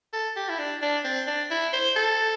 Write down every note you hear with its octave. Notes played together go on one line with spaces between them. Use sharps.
A4
G4
E4
D4
D4
C4
D4
E4
C5
A4